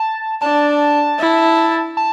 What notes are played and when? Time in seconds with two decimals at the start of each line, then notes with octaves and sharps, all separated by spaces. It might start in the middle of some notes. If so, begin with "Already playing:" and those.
Already playing: A5
0.42 D4 A5
1.19 E4
1.97 A5